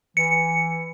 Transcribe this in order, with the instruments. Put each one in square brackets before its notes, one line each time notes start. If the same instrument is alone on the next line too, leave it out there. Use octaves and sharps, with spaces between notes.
[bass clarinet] E3 [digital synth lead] C#7